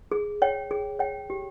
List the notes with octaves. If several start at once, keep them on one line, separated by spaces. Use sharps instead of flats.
G#4
C#5 G5
G#4
C#5 G5
G4